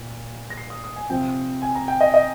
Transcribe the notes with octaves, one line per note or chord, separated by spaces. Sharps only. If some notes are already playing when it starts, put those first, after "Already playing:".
Already playing: A#2
A#6
C7
D#6
D#6
G#5
C3 F3 C4 G5
G#5
A#5
G5
D#5
D#5